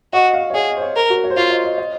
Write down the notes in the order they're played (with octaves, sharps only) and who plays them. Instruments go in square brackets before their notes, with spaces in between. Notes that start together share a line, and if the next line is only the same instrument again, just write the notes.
[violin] F#4 [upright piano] D#5
[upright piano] F5
C#5
[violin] G#4 [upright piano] D#5
[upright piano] C5
C#5
[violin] A#4
[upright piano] F#4
C#5
C5
[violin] F4 [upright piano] C#5
[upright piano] D#5
D#5
D#5